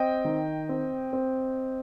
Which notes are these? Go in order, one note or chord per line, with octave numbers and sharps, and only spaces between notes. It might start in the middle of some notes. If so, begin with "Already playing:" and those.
Already playing: C4 D#5 G5
D#3
C4
C4